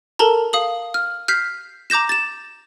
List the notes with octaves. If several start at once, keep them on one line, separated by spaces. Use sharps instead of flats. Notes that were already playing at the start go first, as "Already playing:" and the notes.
A4 A#4 A5 A#5
F5 D#6 F#7
F6
F6 G6 B6 C7
A#5 D6 G6 A#6 E7
A6 E7